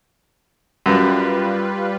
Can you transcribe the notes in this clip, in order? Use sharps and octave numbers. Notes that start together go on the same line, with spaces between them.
F#2 G3 F4 B4